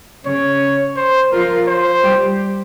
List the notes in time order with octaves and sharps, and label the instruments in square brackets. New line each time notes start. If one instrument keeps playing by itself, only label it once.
[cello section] C#3 C#4 [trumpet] C#5
[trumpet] C5
[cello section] F3 F4 [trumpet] A#4
[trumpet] C5
[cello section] G3 G4